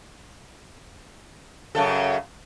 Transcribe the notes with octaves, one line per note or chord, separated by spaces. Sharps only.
F#2 C#3 A4